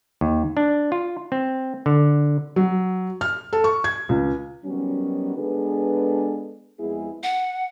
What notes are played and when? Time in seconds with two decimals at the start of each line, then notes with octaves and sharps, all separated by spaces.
0.21 D#2
0.57 D4
0.92 F4
1.32 C4
1.86 D3
2.56 F#3
3.21 F6
3.53 A4
3.64 C#6
3.84 G#6
4.09 C#2
4.65 D#3 F#3 G3 B3 C#4
5.37 G#3 B3 D4 G#4 A4 B4
6.80 F2 G#3 B3 E4 G#4
7.23 F#5